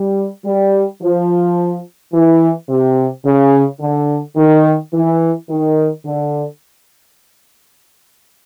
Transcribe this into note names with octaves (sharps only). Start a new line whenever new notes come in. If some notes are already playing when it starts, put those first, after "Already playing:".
Already playing: G3
G3
F3
E3
C3
C#3
D3
D#3
E3
D#3
D3